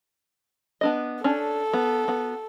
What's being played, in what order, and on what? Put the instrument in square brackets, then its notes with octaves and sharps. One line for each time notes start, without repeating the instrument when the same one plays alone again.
[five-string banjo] B3 D4 D#5
[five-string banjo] C#4 D4 [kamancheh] A4
[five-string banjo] B3
B3 F#4